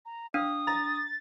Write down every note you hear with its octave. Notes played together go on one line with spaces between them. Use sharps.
A#5
D4 F5 D#6
A#5 A6